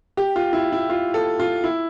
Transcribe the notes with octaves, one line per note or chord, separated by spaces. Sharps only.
G4
F4
E4
E4
F4
A4
F4
E4